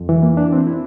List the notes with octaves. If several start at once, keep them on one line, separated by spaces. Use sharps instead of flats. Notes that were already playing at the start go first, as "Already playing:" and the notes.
Already playing: F2
E3
A#3
D4
C4
E4